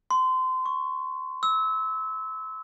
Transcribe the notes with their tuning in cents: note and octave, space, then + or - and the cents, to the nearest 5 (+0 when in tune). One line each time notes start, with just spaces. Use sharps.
C6 -25
C#6 -5
E6 -25